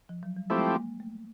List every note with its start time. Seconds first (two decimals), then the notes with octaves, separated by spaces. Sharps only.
0.09 F3
0.23 F#3
0.37 G3
0.50 F3 G#3 A3 C4 E4 G4
0.75 A#3
1.00 A3